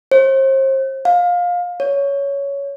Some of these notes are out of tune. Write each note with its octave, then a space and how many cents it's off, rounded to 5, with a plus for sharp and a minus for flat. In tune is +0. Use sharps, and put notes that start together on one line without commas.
C5 +40
F5 +20
C#5 +10